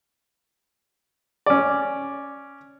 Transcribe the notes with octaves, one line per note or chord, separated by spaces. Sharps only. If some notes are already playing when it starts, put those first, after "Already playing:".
C#4 D5